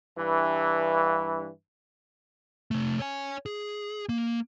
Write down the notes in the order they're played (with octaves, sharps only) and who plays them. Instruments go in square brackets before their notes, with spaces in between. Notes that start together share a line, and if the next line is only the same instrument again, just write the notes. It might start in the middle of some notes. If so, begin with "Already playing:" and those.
[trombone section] G2 E3
[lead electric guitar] C3 A3
C#5 G#5
G#4
A#3